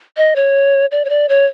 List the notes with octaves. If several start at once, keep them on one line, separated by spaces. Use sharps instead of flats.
D#5
C#5
D5
C#5
D5
C#5